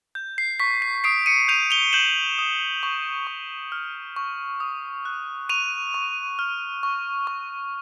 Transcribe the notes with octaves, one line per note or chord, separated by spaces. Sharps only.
G6
C7
C#6 B6
C7
D#6 C7 D7
C#7 D#7
G6 D#7 F7
F7 G7
G6 E7 F#7
D#6
C#6
C#6
F6
C#6
D#6
F#6
C#6 D#7 F7
C#6
F6
C#6
C#6